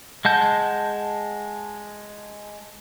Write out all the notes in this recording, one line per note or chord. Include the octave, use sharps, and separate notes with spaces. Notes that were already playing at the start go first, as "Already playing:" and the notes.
G#3 F#5 A5 G6